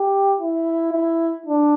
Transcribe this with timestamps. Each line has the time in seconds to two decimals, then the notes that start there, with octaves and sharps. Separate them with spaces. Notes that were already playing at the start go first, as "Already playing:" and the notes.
Already playing: G4
0.40 E4
0.93 E4
1.46 D4